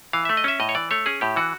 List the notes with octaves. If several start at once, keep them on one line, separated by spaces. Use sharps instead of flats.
E3 F5
A3 E5
D#5
C#4 E5
A2 D#5
C#5
E3 D5
A3 C#5
C#4 G#4
A2 G4
E3 F#4